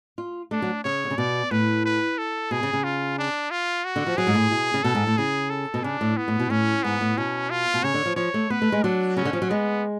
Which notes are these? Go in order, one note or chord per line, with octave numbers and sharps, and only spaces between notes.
F4
A3 D4
F#3
C#3 C#5
D3
C#3
B2 D5
A2 B4
B4
A4
B2 G#4
C#3
C#3
F4
D4
F4
F#4
D3
F3
F#3 G#4
G#2
A2
B2
C#3
B2 A4
G#2
A2
C#3 G#4
A4
B2
C#3 D4
A2
B3
A2
B2
A2 C#4
G#2 B3
A2
B2 C#4
F4
B2
C#3 C#5
D3
F3
F3 C#5
A3
B3 B4
A3
G#3
F#3 D4
C#3 C#4
D3
F3
F#3
G#3 B3